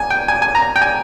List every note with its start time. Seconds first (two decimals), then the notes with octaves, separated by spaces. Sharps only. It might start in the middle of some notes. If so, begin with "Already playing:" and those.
Already playing: G#5
0.10 G5
0.28 G#5
0.42 G#5
0.55 A#5
0.76 G5
0.82 G#5